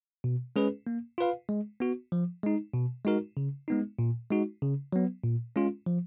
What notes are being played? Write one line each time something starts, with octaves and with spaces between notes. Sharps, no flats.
B2
G#3 C#4 G#4 B4
A#3
F4 B4 F5
G#3
B3 F#4
F3
G#3 D#4
B2
G#3 D#4 F#4 A#4
C#3
G#3 B3 D#4
A#2
G#3 D#4 F#4
C#3
F#3 B3
A#2
G#3 C#4 F4
F3